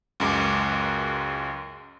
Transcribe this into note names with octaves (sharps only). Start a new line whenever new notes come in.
C#2 F#2 G#3 D6